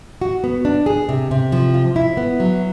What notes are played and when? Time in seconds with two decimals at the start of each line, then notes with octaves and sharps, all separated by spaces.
0.21 F#4
0.44 B3
0.65 D4
0.86 G#4
1.09 C3
1.31 C3
1.52 F3
1.74 F4
1.96 E4
2.17 B3
2.40 F#3